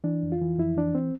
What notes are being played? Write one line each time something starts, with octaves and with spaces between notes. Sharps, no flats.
E3 D4
F2
F4
E3
F2 E4
E3 D4
C4